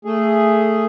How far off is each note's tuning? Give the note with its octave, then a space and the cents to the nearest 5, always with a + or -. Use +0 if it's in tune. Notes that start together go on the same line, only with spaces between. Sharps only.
A3 +15 G#4 +0